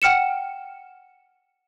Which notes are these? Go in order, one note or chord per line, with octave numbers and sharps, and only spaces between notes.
F#5 G5 F6 C#7 E7